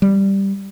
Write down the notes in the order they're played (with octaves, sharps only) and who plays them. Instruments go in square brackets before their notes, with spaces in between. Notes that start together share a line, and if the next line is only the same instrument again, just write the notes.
[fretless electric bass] G3